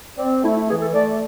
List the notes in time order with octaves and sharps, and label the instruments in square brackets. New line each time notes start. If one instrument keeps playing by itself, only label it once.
[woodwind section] C4 D5
A3 E4
E4
E3 G#4
A4
A3 D5